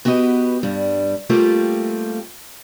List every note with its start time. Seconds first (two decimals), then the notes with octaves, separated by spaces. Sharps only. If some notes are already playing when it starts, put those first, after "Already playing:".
0.05 B3 F#4 G4 B4 D#5
0.63 G2 G3
1.30 G3 A3 A#3 C4 F4 G4